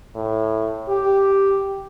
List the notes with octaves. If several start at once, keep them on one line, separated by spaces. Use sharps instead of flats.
A2
G4